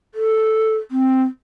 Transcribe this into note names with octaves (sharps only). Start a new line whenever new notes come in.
A4
C4